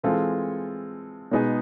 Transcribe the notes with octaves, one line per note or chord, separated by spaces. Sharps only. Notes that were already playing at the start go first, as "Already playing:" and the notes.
E3 G#3 C4 F4 A4
B2 G#3 B3 D#4 G#4